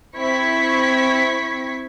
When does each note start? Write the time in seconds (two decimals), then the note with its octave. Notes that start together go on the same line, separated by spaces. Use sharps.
0.18 C4 E4 C#6 G#6 B6